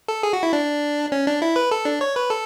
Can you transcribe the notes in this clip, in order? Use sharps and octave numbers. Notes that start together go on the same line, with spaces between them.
A4
G#4
F#4
E4
D4
C#4
D4
E4
B4
A4
D4
C#5
B4
A4